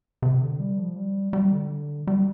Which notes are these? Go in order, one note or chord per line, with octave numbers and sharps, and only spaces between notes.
C3
D3
G3
F3
G3
G3
D3
G3